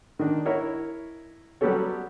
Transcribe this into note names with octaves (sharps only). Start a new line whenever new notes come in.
D#3 D4
E4 A#4 C#5 D#5
F#3 G3 B3 G4 A4 C#5